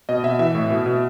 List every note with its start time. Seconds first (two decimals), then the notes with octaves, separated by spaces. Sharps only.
0.09 B2 D#5
0.24 B2 E5
0.39 E3 E5
0.55 A2
0.70 B2
0.86 B2